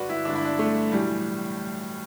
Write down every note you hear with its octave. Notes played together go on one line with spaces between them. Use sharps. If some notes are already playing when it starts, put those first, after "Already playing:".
Already playing: G1 G2 D3 F#4 B4 D5
E4
G1 G2 D3 D4
E4
D4
A3
B1 A2 E3 G3